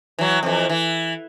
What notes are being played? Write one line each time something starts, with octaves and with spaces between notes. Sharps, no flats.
E3 F#3
F2 E3
E3